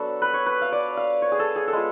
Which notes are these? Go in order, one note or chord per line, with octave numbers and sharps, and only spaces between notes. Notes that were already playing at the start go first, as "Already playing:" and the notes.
Already playing: F#3 B3 D4 A4
B4
C#5
B4
F5
D5
F5
C#5
G#4
A4
G#4
A4
G#3 B3 F4